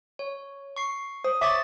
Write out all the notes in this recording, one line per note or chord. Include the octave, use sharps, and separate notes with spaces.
C#5
C#6 C7
C5 D#6
C#5 E5 C#6 D6 A6 B6